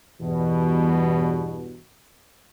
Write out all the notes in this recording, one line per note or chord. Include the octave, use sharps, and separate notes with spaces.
E2 G2 B2